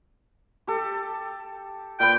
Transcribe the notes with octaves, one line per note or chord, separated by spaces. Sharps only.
G4 A4
A#2 B4 G5